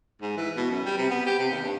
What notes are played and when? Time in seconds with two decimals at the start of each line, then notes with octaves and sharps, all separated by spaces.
0.22 G#2
0.37 E3
0.56 B2
0.70 F#2
0.85 G3
0.98 C3
1.11 B3
1.26 G4
1.39 C3
1.51 D#2
1.63 G2